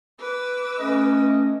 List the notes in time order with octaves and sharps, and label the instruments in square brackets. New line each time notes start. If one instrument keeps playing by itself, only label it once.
[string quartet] B4 D6 E6
[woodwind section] A3 C#4 [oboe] D#5